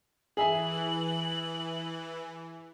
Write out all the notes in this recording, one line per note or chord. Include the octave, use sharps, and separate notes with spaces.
E3 G#4 E5 G#5 F#7